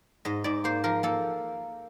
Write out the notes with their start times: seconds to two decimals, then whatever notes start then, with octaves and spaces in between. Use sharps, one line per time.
0.25 G#2 D#5
0.44 G#2 D5
0.64 A#3 C5
0.84 F3 A#4
1.03 A#3 A4